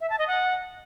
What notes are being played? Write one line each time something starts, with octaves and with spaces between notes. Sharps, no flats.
E5
A5
D#5
F#5